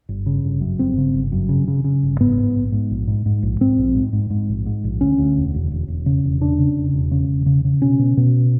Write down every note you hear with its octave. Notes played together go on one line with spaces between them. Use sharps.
G1
C#3
G1
F#2
G1 C4
C#3
G1
F#2
C#3
C#3
C#3
G1
G#2 B3
G#2
A#1
G#2
A#1
G#2
G#2
A#1
G#2 C4
A#1
G#2
G#2
G#2
A#1
G#2
A#1
D2 C#4
D2
E1
E1
E1
E1
C#3
E1
C#3 D4
C#3
E1
E1
C#3
E1
C#3
C#3
B2 C#4
B2
B2